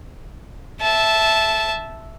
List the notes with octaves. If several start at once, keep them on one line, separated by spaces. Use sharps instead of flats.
E5 A5